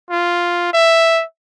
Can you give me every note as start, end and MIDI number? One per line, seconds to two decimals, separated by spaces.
0.11 0.70 65
0.73 1.23 76